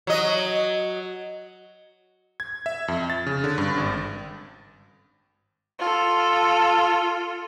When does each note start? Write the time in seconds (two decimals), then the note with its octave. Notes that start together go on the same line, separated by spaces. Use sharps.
0.07 F#3 D#5
2.40 G#6
2.66 E5
2.88 F2
3.10 A6
3.26 C#3
3.44 D3
3.58 G2
3.77 G#1
5.79 F4 A4